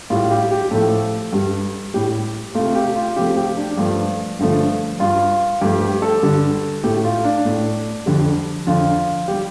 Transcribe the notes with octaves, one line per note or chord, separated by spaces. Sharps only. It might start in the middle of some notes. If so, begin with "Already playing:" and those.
A2 G3 F4
G4
G4
A2 F3 A3 A4
G2 G3
A2 G3 G4
C3 A3 F4
G4
F4
C3 F3 A3 G4
G4
D4
G2 F3 A3
G2 D3 F3 A3
G2 G3 F4
G2 F3 A3 G4
G4
A4
G2 D3 G3
A2 A3 G4
F4
D4
A2 A3
F2 D3 G3
F2 D3 F3 F4
G3 G4